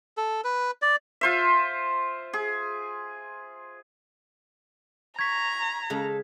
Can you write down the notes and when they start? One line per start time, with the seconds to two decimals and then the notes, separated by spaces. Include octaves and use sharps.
0.17 A4
0.44 B4
0.82 D5
1.21 F4 C5 E5
2.33 G#4
5.19 A#5 C#6 G#6 B6
5.90 C#3 G#3 A4